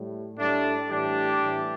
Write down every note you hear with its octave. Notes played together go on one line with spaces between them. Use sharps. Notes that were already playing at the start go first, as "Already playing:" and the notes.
Already playing: A2 G3
A2 G3 A3 D4
A2 E3 G3 D4 G4
A2 E3 G3